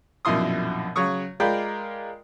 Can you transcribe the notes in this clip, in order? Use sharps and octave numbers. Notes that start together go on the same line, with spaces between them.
A#1 F#2 B2 E4 C6 D#6
C#3 F#3 C#5 C#6 D#6
G#3 F4 A#4 D5 G5 B5